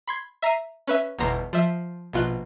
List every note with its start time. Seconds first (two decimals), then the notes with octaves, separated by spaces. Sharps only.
0.08 B5 C6 G#6
0.42 E5 A#5 C7 D#7
0.87 C#4 B4 E5
1.19 G1 E2 B2 A#5 C6
1.53 F3 E5
2.13 A#1 B2 F4 F#6